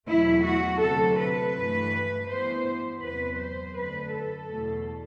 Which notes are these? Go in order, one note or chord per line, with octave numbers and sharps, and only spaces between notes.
E2 B2 F#3 A3 E4
F#4
D2 C3 F#3 A4
B4
G2 E3 A3
G2 E3 B3 C5
E2 C3 F#3 B4
C5
F#2 D3 A3 B4
A4
E2 B2 A3